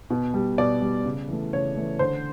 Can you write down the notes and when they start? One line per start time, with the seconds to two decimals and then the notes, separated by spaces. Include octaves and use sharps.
0.10 B2
0.34 G3
0.58 B2 D5
0.82 G3
1.05 C#3
1.29 E3 A3
1.53 C#3 C#5
1.76 E3 A3
1.99 D3 C5